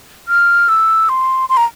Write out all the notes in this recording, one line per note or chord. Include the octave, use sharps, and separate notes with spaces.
F6
E6
C6
C6
A#5